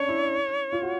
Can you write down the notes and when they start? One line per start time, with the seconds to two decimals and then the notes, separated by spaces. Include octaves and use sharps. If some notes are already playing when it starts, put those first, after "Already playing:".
Already playing: C#4 D4 C#5
0.08 E4
0.73 F4
0.82 F#4